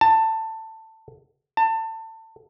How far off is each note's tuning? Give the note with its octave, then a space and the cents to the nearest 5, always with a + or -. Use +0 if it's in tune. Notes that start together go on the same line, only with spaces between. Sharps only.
A5 +15
A5 +25